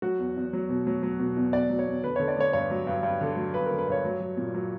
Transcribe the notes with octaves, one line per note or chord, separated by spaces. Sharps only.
F#3 F#4
E2
E2
F#3
B2
F#3
F#3
B2
E2
E2 D5
F#3
C#5
E2
D3 B4
D3 C#5
D5
D3 C#5
G2 C#5
F#3
G2
G2
D3
F#3
G2 B4
A#4
D3
B4
G2 C#5
F#3
F#3
A#2
F#3